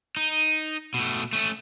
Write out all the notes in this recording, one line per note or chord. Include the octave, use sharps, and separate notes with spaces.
D#4
B2 A3
A3 C#4